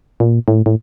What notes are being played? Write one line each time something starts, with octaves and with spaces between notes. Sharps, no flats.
A#2
A2
A2